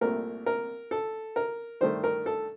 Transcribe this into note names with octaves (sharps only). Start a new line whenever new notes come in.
C2 A#2 A3 A#4
A#4
A4
A#4
G2 D#3 A3 C5
A#4
A4